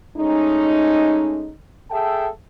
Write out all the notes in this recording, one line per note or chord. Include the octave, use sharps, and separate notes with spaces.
G#3 A3 C#4 D#4
G#4 A4 E5 G5 A5